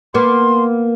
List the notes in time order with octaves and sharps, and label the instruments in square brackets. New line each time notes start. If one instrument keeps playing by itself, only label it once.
[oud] A#3 B3 [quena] C6